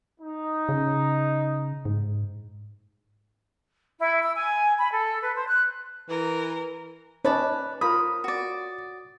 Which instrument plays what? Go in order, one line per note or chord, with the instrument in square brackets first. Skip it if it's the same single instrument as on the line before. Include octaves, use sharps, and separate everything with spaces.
[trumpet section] D#4
[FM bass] C#3
G#2
[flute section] E4
E6
G#5
B5
A4
B4
C5
F#6
[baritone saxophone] E3 [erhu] A#4
[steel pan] C#4 D#4 [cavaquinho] B4 D5 A5 [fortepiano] C#5
[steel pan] F4 A#4 [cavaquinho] B5 [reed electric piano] D#6
[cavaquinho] F#4 D5